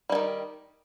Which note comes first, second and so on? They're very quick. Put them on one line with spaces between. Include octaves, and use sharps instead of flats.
G3 E3 D#3